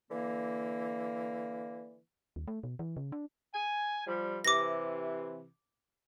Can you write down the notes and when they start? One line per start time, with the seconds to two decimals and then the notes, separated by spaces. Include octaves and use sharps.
0.11 D3 E3 A#3
2.36 D#2
2.48 A3
2.64 B2
2.79 E3
2.97 C#3
3.12 D4
3.54 G#5
4.07 F3 G3
4.45 C3 E3 D6 A#6